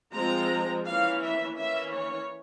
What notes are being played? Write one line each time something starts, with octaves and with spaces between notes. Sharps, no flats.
F3 G#3 C4 A#5
E3 A#3 C#4 F5
E5
E3 A#3 C#4 E5
C#5